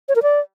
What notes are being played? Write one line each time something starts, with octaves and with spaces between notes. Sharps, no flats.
C#5
A#4
D5